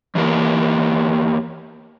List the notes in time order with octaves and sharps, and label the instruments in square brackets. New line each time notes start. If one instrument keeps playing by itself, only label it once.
[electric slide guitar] E2 E3 A#3 G4 A#4